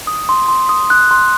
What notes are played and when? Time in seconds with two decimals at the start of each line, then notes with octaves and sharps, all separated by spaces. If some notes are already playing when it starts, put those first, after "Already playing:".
0.07 D#6
0.29 C6
0.48 C6
0.69 D#6
0.90 F#6
1.11 C6